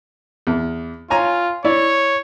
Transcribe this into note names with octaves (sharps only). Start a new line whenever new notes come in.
E2
F4 C#5 G#5 A#5
E4 C#5 D5